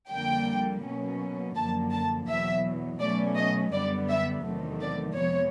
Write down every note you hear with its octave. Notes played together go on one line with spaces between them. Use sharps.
F2 D3 G3 A#3 G5
B2 F#3 A#3 C#4
F#2 D3 F3 A#3 A5
A5
E2 B2 F#3 E5
B2 F#3 A3 C#4 D5
D#5
F#2 D3 G3 B3 D5
E5
E2 C3 D#3 F#3 A3
D5
F2 C3 F3 G#3 B3 C#5